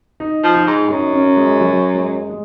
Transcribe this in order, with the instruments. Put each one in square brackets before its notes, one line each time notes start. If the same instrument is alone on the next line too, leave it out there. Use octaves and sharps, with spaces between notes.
[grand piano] D#4
[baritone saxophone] F3
[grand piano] D#4
[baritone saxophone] G#2
[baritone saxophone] F#2 [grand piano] D#4
[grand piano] C#4
G#3
F#3
G#3
G#3